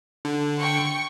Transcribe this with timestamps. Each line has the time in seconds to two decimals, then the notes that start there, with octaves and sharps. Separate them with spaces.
0.25 D3
0.60 G5 C#6